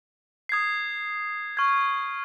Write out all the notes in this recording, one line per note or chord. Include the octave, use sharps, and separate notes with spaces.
D#6 G#6 C7
C#6 F6 G#6